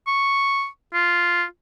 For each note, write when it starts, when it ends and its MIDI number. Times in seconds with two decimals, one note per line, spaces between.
0.07 0.67 85
0.94 1.43 65